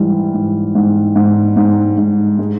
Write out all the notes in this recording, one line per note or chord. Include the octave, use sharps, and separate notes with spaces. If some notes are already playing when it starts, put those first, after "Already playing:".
Already playing: G#2 E3 G3
G#2
G#2
G#2
G#2
G#2
G#3